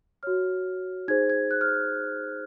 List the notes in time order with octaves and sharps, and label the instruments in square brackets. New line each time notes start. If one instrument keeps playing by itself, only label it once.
[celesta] F#4 C#5 F6
D#4 G#4 C5 G#6
G#6
F#6
F6